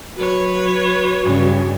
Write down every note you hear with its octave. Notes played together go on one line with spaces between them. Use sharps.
F#3 F#4 B4 C#5
G2 C#3